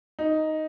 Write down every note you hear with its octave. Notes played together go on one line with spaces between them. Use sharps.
D#4